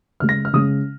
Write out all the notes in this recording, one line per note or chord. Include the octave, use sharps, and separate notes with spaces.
C#3 G#3 F6
A#6
F6
C#3 G#3 D#6